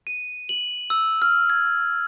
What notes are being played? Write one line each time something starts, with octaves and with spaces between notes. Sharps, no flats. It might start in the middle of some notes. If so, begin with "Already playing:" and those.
D#7
F#7
E6
F6
G#6